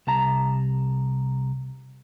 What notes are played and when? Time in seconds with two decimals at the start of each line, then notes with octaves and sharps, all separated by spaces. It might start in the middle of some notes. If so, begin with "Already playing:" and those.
0.07 C2 A5 A#5